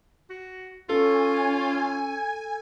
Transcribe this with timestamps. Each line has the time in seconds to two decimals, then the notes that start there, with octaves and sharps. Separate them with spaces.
0.30 F#4
0.89 C#4 F4 A4 G#5